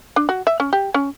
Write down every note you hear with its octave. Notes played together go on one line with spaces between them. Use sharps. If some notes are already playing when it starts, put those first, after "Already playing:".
D4
F#4
E5
C#4
G4
C#4